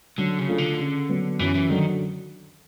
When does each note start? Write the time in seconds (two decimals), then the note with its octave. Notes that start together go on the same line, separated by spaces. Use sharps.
0.18 D3 F#3
0.38 C#3
0.48 A3 D4 F4 A4
0.58 D3
0.79 C#3
1.09 F#3 B3
1.39 F#2 E3
1.55 E3
1.69 D3 D#3 F#3